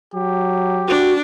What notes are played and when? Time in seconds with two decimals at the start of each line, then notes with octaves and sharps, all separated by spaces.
0.14 F#3 G4
0.88 D4 F#4